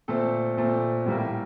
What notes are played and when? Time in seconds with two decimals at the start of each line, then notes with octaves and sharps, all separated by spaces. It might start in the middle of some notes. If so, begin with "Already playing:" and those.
0.08 A#2 A3 C4 A4
0.57 A#2 A3 C4
1.06 A2 G3 A#3